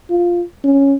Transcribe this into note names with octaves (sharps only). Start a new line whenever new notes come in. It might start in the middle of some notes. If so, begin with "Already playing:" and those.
F4
C#4